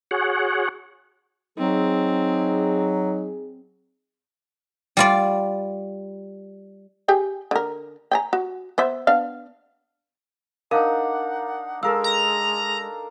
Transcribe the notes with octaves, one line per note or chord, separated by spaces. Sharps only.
F#4 G#4 C#5 F#5
F#3 C4 D#4 G#4
G3 F4 D5
G4 G#4 G5
D3 A#4
G5 G#5 A#5
F#4
B3 C5 E5
B3 D4 F5
D4 D#4 A#4 F5 F#5 A#5
G#3 A4 A#4 F5 E6
A#5